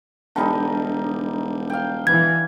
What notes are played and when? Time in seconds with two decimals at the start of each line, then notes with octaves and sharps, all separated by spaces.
0.36 E1 D3 G3 D#4
1.70 F5 G5
2.07 E3 G#6